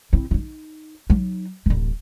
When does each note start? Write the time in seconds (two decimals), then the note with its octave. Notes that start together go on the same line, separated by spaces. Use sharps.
0.13 C4 E4
0.31 D#4 F4
1.10 F#3 D#4
1.66 D1 A1